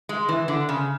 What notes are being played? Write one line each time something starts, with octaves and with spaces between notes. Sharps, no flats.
G#3
E3
D3
C#3